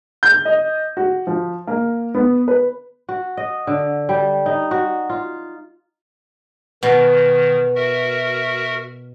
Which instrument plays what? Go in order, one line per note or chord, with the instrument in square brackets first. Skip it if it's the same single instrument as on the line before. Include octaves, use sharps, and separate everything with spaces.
[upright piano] G6
D#5
F#4
F3
A#3
B3
B4
[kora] F#4
D#5
D3
G3
D#4
F#4
F4
[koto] B2 [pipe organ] D#3
[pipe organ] F#4 A#4 E5